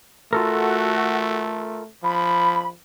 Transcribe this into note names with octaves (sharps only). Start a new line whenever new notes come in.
A3 F4 F#4 A4 A#4
F3 B5